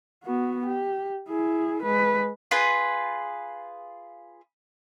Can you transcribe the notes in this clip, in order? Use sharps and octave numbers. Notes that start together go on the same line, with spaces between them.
B3 F#4
G4
E4 G#4
G#3 B4
F4 G#4 B4